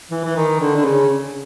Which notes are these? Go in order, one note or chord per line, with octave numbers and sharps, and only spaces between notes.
E3
E3
D#3
D3
D3
C#3